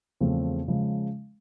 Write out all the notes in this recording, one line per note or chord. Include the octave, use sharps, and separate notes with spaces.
E2 C#3 F3 A3 C4
C#3 F3 G#3